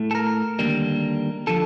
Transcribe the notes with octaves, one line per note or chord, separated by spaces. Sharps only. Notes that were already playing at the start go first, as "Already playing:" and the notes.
Already playing: A2 A3
A4
A#4
D#2 D3 G3 A#3
D3 F3 A4